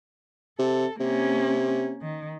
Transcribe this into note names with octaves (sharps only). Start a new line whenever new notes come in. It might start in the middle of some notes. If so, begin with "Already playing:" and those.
C3 A4
C3 A#3 C#4
D#3